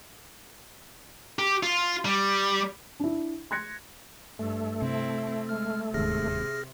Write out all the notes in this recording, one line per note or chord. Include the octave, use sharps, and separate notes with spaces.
G4
F4
G3
D4 E4
C6 F#6 G#6 A#6 C#7
G2 A3
C3 C4 E4
G#3 F6
D1 D#2 G#2 C3 G#4 F6 A#6